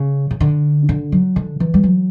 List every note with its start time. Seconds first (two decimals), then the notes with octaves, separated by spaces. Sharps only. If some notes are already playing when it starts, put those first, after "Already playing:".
Already playing: C#3
0.31 C#3
0.40 D3
0.89 D3
1.12 F#3
1.36 D3
1.60 E3
1.74 G3
1.83 F#3